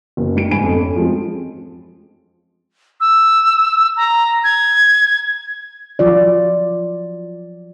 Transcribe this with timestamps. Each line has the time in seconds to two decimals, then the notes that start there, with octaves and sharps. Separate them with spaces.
0.17 F#1 B3
0.35 G3 D#4 C#7 D7
0.50 G1 G#2 G#5 B5 D7
0.63 F2
0.77 C#4 A4
0.96 F3 G#3 C4
3.01 E6
3.96 A#5
4.44 G#6
5.99 F3 F#3 F4 D5